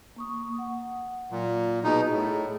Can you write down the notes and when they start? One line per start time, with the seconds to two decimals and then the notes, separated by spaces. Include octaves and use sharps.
0.16 A#3 C#6 D#6
0.59 F#5
1.31 A#2 F#3
1.84 B2 D#4 G#4
2.11 A2